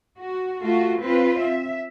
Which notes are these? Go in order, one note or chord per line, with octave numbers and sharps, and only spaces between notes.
F#4
A3 F4 F#4
C4 F4 B4
E5